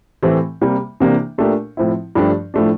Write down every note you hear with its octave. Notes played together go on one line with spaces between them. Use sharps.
A2 E3 A3 C4 G4
C3 G3 A#3
C3 E3 A#3 D4 G4
A#2 A3 D4 G4 A#4
A2 F3 C4 E4
G2 F3 A3 D4 G4
A2 F3 A3 D4